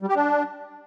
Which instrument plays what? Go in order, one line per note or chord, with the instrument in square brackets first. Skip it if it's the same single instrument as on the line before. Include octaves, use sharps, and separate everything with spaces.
[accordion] G3
G4
D4